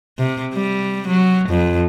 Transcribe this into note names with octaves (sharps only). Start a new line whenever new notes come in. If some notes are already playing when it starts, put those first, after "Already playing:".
C3
G3
F#3
F2